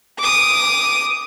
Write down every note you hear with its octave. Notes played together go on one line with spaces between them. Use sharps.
D6 D#6